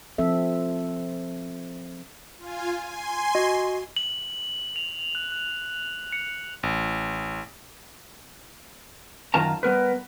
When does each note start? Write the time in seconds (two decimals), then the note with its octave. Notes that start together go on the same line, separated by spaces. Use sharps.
0.18 F3 C4 A4 E5
2.38 F4 G#5
2.83 G#5 C6
3.35 F#4 D#5
3.96 F#7
4.76 F7
5.15 F#6
5.32 F#6
6.12 C#7
6.63 A1
9.34 F#2 D#3 F4 A#4 A5 A#5
9.63 G3 B3 A#4 B4